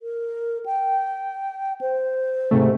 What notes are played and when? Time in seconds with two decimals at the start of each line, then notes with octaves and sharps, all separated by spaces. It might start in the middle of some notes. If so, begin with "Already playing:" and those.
0.02 A#4
0.66 G5
1.81 C5
2.51 G#2 C3 A3